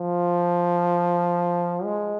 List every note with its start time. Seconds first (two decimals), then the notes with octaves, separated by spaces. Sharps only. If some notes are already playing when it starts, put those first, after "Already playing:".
Already playing: F3
1.84 G#3